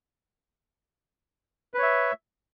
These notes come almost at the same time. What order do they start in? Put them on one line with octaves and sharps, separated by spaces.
B4 C#5 E5